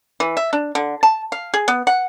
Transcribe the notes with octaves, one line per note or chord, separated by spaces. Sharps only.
E3
E5
D4
D3
A5
F5
G#4
B3
F#5